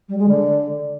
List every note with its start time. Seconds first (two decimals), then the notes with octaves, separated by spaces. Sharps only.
0.08 G3
0.18 G#3
0.28 D3